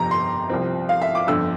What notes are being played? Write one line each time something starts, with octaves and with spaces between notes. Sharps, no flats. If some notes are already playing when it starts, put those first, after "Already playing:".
Already playing: G1 F2 C3 A#5
C6
C2 C3 F3 C4
F5
E5
D6
G1 F2 D3 E6